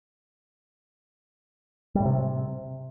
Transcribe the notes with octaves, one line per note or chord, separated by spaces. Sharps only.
G3
A2
C3